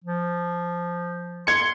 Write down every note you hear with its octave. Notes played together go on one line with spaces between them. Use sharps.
F3
C6 G#6 C#7